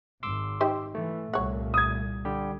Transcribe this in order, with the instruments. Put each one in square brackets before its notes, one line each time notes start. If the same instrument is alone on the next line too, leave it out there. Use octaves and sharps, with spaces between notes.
[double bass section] G#1 [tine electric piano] C6 D6 E6
[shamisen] D#4 G4 C5
[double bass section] E3 [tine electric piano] A3
[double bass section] C2 A#2 [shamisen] C#5 F#5
[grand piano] D#6 G#6
[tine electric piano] D3 G3 G4